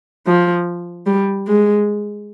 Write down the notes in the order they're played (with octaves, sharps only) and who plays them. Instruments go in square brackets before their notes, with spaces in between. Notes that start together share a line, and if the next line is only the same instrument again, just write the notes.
[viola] F3
G3
G#3